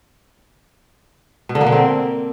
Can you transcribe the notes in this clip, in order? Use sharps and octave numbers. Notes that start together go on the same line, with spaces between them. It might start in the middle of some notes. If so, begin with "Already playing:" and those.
B2
D3
A#3
D3
C4